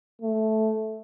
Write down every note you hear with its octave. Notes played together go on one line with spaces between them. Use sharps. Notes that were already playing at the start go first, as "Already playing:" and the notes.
A3